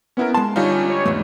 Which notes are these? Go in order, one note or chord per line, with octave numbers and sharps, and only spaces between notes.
B3 C#4 E4 A#4
G#3 A5 C6
D3 G3 C#4 D#4 F4
C#5
E2 G#2 A3